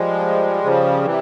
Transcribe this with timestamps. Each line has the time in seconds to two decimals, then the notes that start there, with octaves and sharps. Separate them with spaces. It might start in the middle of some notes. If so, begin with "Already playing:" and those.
Already playing: F3 G3 G#3
0.64 C#3 F3
1.04 C3 E3